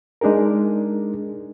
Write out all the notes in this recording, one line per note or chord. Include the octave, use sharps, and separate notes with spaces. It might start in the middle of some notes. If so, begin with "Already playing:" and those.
G#3 D4 D#4 G#4 A#4